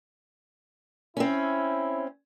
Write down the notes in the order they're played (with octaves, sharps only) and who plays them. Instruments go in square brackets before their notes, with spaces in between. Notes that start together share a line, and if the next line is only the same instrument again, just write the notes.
[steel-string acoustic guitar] C4 C#4 [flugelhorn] E4